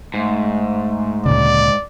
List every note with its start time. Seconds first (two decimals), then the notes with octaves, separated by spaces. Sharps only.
0.14 G#2 A3
1.26 D2 A#2 C#3 D5